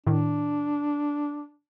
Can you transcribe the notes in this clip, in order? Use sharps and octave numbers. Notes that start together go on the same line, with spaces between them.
A2 D#3 D4